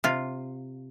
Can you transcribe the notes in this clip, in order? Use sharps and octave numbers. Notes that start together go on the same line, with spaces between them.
C3 F4